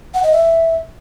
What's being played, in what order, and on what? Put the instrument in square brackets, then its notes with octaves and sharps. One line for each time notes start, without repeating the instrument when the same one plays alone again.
[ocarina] F#5
D#5
E5